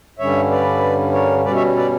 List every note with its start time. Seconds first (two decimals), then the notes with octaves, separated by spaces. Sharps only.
0.19 G2 D3 G3 C#4 C#5 E5
0.51 B4 D5
1.13 A#4 C#5
1.44 B2 G3 C#4 B4 D5
1.55 C#5 E5
1.76 B4 D5